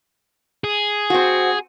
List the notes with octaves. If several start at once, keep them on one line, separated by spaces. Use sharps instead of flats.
G#4
C4 F#4